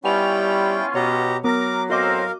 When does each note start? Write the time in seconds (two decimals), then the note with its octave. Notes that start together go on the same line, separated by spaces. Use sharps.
0.05 G3 B3 C#4 E4 F4 G5 G#5 F7
0.95 B2 G4 C#5 A#5
1.44 F#3 B3 A#4 D6 A#6
1.90 A2 C4 F#4 A#4 D#5 F5 A#5 D6